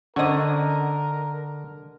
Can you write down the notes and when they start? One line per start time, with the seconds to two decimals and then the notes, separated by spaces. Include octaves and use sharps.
0.16 D3 C#4 D4 A#4 C5 D#5 F#5